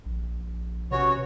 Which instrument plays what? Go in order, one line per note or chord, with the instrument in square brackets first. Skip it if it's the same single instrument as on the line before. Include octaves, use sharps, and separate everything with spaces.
[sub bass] A#1
[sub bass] C3 [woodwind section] B3 C#4 F#4 [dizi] C#5